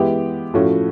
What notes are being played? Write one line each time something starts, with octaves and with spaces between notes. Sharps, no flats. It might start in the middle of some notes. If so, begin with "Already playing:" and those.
Already playing: E3 G#3 B3 E4 G4
A2 F3 A3 C#4 F#4